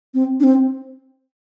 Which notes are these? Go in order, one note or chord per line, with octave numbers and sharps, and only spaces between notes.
C4
D4
C4